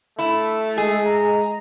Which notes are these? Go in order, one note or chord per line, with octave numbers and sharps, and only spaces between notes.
A3 E4
G#3 G#4
A#5